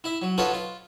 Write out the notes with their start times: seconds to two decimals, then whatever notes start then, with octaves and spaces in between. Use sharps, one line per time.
0.04 E4 E5
0.22 F#3
0.38 D#4 F4 F#4 A4 B4 C#5
0.53 F4